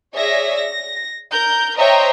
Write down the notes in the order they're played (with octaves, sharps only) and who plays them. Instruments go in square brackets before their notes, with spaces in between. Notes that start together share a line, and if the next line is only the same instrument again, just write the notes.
[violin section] G#4 C#5 D5 E5 A#6
A#6
A#4 G6
C5 C#5 D#5 E5 G5 A#5